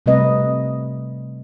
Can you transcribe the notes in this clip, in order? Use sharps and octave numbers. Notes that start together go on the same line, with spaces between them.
C3 G3 A3 C4 B4 D#5